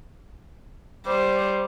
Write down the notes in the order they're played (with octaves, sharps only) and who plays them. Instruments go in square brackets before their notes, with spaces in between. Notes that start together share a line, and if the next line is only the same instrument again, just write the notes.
[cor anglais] G3 [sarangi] C5